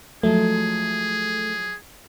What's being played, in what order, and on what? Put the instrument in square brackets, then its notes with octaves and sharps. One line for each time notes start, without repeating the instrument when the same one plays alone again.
[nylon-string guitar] F3 F#3 G#3 [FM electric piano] A3 [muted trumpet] G#4